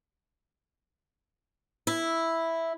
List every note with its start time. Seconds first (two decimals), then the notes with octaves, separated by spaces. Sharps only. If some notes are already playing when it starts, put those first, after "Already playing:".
1.87 E4